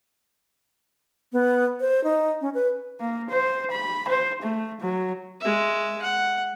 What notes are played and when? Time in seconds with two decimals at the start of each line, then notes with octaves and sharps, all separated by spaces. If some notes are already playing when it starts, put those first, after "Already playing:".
1.33 B3
1.80 C5
2.04 D#4
2.41 C#4
2.54 B4
3.00 A#3
3.30 C5
3.71 B5
4.08 C5
4.42 A3
4.80 F#3
5.40 G#3 E5
6.02 F#5